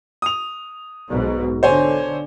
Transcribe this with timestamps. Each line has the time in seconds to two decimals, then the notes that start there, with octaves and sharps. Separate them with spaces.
0.22 D#6 F7
1.09 B1 G#2 B2
1.63 D3 C5 C#5 G#5